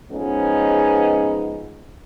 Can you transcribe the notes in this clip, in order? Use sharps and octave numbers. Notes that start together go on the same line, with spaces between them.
F3 G#3 B3 C#4 D#4